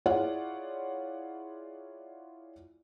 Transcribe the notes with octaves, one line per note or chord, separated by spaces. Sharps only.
E4 F4 G#4 C#5 D5 F#5